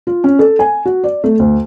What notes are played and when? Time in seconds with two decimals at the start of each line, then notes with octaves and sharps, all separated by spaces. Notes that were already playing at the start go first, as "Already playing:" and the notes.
0.07 F4
0.24 C#4
0.39 A4
0.59 G#5
0.85 F#4
1.04 D5
1.24 A3
1.40 D2